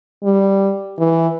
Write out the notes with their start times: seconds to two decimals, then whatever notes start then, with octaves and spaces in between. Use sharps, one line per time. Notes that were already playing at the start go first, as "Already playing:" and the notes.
0.24 G3
0.98 E3